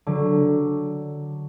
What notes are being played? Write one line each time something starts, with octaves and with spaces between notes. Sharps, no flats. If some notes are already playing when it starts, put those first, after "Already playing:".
D3 F#3